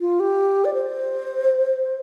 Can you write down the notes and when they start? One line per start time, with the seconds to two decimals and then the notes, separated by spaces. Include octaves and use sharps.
0.01 F4
0.20 G4
0.65 D5
0.74 C5